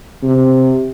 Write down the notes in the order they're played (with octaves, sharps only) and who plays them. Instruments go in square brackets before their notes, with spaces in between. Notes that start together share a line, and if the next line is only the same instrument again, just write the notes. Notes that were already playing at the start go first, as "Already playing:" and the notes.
[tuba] C3